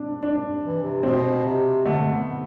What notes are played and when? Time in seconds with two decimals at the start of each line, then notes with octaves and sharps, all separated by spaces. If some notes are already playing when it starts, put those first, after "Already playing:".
Already playing: C4 D4
0.23 D4
0.64 E3
0.83 C3
1.03 B2 C4
1.45 C3
1.85 D3 A3
2.12 B3